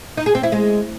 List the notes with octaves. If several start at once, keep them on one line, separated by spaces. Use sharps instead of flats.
D#4
G#4
C4
E4
G#3